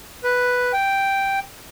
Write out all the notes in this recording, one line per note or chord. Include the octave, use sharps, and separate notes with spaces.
B4
G5